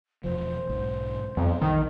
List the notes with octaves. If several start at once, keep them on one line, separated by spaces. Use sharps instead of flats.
E1 B1 F3 C5
B1 G#2
F2 G3 B3
A#1 D#3